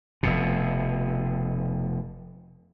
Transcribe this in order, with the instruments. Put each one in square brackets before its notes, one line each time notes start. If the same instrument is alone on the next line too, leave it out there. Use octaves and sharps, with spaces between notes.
[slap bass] F1 F2 B2